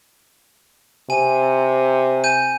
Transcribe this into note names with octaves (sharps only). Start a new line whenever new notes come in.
C3 G#5 D#7
G#5 G6 D#7